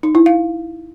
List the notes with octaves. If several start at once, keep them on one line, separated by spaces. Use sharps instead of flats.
D#4
E4
F5